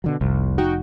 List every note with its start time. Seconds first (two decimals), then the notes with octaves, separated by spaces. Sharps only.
0.04 B2 D3 F#3
0.21 F1 C2
0.58 D#4 F#4 G5